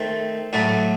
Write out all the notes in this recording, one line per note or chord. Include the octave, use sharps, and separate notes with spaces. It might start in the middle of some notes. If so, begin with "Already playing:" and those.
Already playing: D#3 A3 C4
A2 F#3 A3